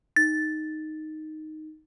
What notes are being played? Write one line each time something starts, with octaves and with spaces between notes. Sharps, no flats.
D#4 A6